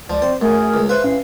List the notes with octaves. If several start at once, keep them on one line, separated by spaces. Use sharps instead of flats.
C#2 F3 D5
C4 C5
F#2 A3 G#4 A#4
C#2
B4 C5 E5 F5 F#6
A2 C#4 F5